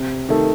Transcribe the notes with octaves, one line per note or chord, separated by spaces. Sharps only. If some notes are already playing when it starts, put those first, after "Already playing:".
Already playing: C3
D#3 A3